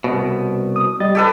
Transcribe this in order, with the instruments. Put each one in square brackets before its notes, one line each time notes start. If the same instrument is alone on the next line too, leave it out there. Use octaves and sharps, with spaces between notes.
[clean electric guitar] C2 B2
[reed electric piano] D#6
G3 D#5 A6
[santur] G4 A4 B4